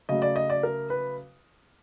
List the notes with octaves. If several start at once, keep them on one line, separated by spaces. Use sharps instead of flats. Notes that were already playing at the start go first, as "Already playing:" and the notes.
C#3 F#3 A3 D#5
D5
D#5
D5
A#4
B4